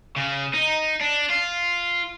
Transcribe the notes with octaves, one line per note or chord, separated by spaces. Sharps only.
C#3
D#4
D4
F4